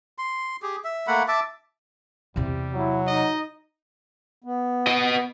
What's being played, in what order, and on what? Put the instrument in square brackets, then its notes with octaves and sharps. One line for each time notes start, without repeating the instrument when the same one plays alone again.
[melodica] C6
G4 G#4
E5
A3 A#3 F#5 B5
E5 A5 D6
[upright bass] E2 C3 [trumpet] G3
[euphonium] F#3 [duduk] E4
[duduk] D#4 [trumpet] D#5
[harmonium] B3
[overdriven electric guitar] B4 D#5